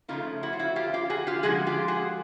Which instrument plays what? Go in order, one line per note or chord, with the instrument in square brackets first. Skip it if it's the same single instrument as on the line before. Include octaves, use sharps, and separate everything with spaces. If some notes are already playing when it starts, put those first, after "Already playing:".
[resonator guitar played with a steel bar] C#3 F3 A3 D#4 F4
E4 F#4
F4
E4 F#4
F4 G4
F4 G4
F#4 G#4
F4 G4
D3 F3 G#3 F#4 G#4
F4 G4
F#4 G#4